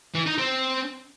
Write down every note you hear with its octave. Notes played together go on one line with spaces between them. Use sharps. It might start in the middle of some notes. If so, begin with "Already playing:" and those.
E3
D#4
C4